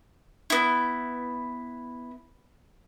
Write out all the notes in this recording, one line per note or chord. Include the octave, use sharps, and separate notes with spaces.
B3 E4